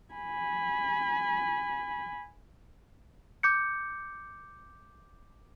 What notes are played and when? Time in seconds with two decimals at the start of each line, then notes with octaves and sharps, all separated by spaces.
0.14 G#5 B5
3.43 D6 G6 C#7